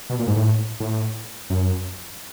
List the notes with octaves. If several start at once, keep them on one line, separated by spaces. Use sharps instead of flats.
B2
A#2
G#2
A2
A2
F#2